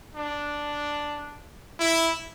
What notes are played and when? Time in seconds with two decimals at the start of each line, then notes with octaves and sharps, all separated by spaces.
0.15 D4
1.79 E4